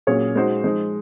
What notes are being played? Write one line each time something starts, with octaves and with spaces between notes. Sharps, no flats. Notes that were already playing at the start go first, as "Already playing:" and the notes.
A#2 F#3 C#4 G#4 C#5
G#3 D#4 F#4 C5
F3 G#3 D#4